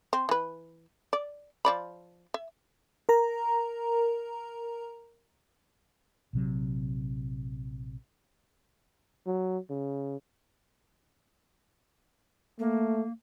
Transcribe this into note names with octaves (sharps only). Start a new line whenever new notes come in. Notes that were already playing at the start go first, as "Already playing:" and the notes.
C4
E3 B4
D5
F3 D5 B5
E5
A#4 A#5
A#1 C3 F#3
F#3
C#3
A3 A#3